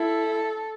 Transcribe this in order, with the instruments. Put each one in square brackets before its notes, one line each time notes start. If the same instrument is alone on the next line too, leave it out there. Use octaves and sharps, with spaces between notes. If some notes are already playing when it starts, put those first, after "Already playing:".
Already playing: [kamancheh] E4 [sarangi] A4